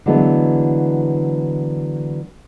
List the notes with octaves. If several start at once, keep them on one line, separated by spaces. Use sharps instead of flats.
D3 E3 F#3 G#3 A3 B3